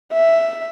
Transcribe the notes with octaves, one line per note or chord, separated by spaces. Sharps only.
E5